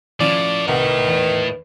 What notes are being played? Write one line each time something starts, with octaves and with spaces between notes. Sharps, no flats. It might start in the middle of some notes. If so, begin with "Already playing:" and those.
A2 F3 C#4 D5
C2 D#3 B4 F#5
E2